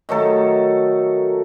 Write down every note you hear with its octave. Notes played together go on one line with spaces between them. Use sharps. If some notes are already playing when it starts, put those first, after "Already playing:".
D#3 F#3 A3 A4